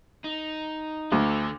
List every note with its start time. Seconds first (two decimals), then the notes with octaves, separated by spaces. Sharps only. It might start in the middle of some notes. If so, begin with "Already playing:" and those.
0.24 D#4
1.12 D2 D3 A4